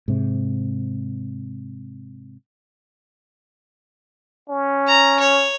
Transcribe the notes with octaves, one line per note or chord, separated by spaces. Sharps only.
G#2 C3
C#4
A#5
C#5